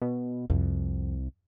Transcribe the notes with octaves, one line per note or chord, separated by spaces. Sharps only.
B2
C2 F2